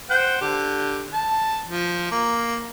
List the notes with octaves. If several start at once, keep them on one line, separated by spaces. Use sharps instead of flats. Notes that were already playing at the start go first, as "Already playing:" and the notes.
C5 F#5 G5
D3 G4
A5
F3
A#3